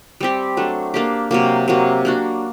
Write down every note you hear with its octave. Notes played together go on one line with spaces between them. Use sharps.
G3 C4 G4
F#3 A3 D4
A#3 D4 G4
C3 F#3 A#3
C3 F#3 A#3
A#3 D4 F#4